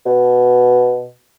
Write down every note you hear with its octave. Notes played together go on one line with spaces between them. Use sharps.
B2